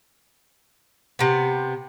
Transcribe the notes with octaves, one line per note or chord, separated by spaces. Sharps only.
C3 B3